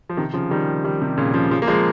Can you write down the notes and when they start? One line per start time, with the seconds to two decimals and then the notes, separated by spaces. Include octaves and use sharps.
0.09 F3
0.17 C3 D#3
0.34 C#3 F3
0.51 D#3 G3
0.84 D#3 G3
1.02 C3
1.18 A#2 C#3
1.34 C#3 F3
1.51 C#3 F3
1.62 A#3
1.67 F3 G#3